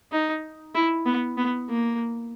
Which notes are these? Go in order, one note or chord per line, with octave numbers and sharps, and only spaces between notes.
D#4
E4
B3
B3
A#3